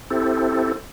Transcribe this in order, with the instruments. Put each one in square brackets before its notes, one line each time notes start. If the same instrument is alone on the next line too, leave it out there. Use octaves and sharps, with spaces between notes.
[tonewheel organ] C4 E4 G4 A4